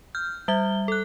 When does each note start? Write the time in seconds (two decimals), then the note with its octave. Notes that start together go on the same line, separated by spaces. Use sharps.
0.15 F6 G6
0.48 G3 E5 G7
0.88 A4 F#6